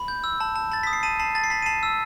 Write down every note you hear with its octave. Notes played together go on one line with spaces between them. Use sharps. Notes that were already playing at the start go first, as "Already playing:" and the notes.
Already playing: B5
G6
E6
A5
A5
A5 A6
D#6 B6
C7
A5 D#7
A5 C7
A5 A6
C7
A5 B6
D#7
A5 C7
E6